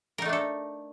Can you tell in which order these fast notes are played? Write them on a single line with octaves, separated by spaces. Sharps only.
A#4 D#4 A3 D4 A4